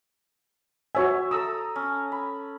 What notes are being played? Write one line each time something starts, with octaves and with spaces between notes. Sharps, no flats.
F#4 C#5 E5 G#5
A4 A#5 D#6 E6
C#4
B5